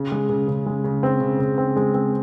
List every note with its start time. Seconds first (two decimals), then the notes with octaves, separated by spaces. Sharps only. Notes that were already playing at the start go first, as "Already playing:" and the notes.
Already playing: C#3
0.12 G#3
0.29 C#3
0.48 C#3
0.66 G#3
0.84 C#3
1.03 C4
1.20 C#3
1.39 C#3
1.58 C4
1.76 G#3
1.94 C4